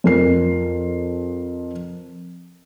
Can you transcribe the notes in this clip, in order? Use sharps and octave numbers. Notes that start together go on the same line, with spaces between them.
F2 A#4 C7